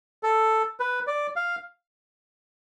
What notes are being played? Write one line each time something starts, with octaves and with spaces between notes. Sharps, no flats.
A4
B4
D5
F5